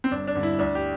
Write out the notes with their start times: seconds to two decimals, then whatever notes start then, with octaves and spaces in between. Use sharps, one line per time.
0.04 C4
0.11 G1 D4
0.28 D4
0.35 G2 D3
0.43 E4
0.59 D2 D4
0.75 G4